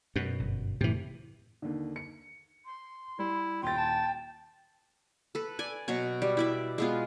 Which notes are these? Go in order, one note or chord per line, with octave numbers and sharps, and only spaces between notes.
F#2 B2
G1
F#1 A2 C3 E3
D#2 D3
C#7
C6
G3 E4
D#1 F4 G5 A6
A5
A4 B4
D5 G#5
B2 F#3 F#4 C#5
G3
E4 D5 E5
G#3 B3 F4